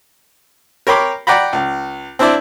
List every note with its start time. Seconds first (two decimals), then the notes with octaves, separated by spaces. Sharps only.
0.87 A#4 C#5 G5 B5 C6 D6
1.27 D5 F#5 G5 A#5 B5
1.53 C#2
2.19 C4 D4 E4 C5 D5